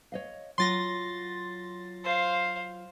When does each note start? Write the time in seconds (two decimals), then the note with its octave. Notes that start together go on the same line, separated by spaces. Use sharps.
0.12 C#5 D#5 F5
0.58 F#3 F4 C6 A6 A#6
2.04 C5 F5